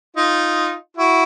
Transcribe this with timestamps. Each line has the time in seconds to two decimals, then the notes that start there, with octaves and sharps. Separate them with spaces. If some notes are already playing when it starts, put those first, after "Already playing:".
0.17 D#4 F4
0.97 E4 F#4